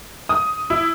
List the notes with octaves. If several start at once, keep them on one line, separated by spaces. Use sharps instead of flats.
D#6
E4